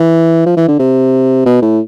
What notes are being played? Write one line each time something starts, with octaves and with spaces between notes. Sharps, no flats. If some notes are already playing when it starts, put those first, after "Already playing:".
Already playing: E3
F3
E3
D3
C3
B2
A2